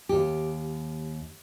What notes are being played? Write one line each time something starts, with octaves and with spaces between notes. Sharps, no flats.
D#2 G4